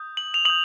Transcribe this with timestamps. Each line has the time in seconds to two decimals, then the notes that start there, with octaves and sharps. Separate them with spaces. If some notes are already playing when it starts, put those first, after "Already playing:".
Already playing: D#6 G6
0.17 F#7
0.34 F7
0.45 D#6 G6 F#7